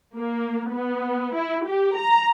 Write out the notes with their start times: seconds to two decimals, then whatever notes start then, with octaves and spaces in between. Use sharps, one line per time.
0.15 A#3
0.71 B3
1.34 E4
1.65 G4
1.96 A#5